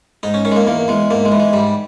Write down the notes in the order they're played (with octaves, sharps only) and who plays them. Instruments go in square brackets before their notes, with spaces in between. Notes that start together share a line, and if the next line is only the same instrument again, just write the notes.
[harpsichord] G#2 D#4
C#4
D#3 C#4
G#3
A#3
E2 A#3
E2 G#3
G#2 A#3
G#3
E3
G#3
G#2 G3